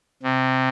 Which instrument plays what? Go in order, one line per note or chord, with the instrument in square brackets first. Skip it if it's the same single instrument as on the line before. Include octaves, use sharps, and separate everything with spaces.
[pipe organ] C3